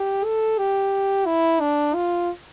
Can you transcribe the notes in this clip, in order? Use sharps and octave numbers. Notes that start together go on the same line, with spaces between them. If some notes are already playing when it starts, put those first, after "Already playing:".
Already playing: G4
A4
G4
E4
D4
F4